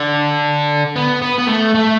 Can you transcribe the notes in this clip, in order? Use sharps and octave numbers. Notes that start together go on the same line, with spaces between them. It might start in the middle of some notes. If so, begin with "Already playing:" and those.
Already playing: D3
B3
B3
B3
A3
A3